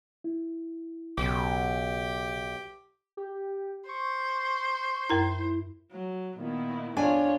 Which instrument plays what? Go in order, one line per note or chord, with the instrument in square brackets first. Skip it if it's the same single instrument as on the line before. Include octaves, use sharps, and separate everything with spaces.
[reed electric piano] E4
[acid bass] B1 [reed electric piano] C#3 [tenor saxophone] G4
[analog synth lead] G4
[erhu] C5 [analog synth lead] C#6
[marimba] F#2 A#4 A#5 [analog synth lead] E4
[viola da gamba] F#3
[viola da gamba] A#2 [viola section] D#3 B3 E4
[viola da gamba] F2 F4 C#5 [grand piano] D4 [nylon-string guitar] G#5